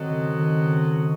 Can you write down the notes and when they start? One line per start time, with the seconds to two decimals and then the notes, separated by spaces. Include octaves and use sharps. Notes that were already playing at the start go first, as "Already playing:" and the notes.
Already playing: D#3 F#3 C4 F#4 A4 D#5
0.11 C#3
0.37 D#3
0.65 C#3